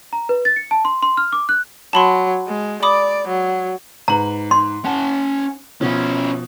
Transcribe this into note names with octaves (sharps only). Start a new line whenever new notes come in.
A#5
B4
A6
C#7
A5
C6
C6
F6
D6
F#6
F#3 A5 B5 C6
G#3
D5 B5 D6 D#6
F#3
G#2 B4 A#5 F#7
C6
C#4 F#5 A5
B2 F3 C#4 E4